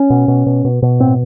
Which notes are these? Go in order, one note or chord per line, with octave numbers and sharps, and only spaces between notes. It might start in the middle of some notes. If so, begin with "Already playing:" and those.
Already playing: C#4
B2
B2
B2
B2
B2
A2 C4